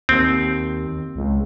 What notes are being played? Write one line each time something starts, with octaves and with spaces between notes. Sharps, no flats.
D#2 C4
C#2